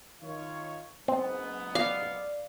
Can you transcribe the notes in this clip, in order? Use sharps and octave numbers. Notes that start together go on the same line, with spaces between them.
D#3 F4 C#5
F#1 G#2 B3 C4
D5 F5